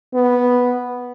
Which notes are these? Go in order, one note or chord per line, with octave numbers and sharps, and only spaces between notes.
B3